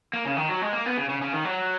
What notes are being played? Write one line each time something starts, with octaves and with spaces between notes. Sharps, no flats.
A#3
C#3
D#3
F#3
G#3
A#3
B3
C#3
C#3
C#3
D#3
F#3